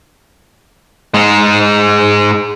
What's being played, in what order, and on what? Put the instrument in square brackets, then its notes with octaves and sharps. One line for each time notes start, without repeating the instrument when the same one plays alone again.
[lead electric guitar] G#2 G#3